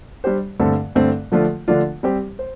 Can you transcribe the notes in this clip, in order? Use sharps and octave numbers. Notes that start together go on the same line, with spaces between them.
G3 D4 G4 C5
G2 D3 A3 C4 A4
G2 D3 A3 C4 A4
D3 F3 A3 D4 F4
D3 F3 A3 D4 F4
G3 C4 G4 C5
C5